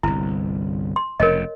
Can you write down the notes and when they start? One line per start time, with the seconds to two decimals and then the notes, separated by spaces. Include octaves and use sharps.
0.03 G1 C2 E4
0.96 C6
1.20 F1 F2 C#3 A#4 C#5 D#5